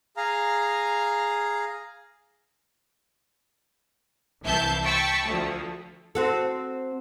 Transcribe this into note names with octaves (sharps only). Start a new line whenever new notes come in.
G#4 F5 A#5
C2 E3 E5 A5 G6
G5 A5 B5 C#6 E6 B6
D2 F3 A3
C4 F#4 A4